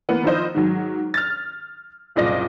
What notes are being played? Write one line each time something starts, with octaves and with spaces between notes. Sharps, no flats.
E3 A#3 B3
D#3 F3 E4 F4 C5 D#5
G#2 D#3 F#3
F6 A6
F#1 C2 A#2 D5 D#5 A#6